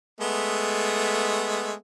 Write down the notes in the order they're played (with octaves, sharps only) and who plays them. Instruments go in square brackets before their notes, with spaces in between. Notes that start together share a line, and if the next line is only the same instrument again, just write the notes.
[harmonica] G#3 A3 B3